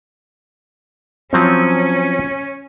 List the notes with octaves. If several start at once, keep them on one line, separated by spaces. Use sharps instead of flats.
F3 F#3 C4 C#4